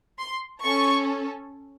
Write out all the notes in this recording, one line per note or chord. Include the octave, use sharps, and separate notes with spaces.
C6
C#4 A4 C#6